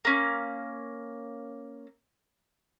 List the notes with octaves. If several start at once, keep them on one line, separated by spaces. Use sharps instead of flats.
A#3 C#4